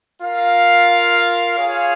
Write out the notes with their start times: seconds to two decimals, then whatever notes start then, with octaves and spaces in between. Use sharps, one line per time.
0.21 F4 A#4 F5
1.57 F4 G#4 C#5 F5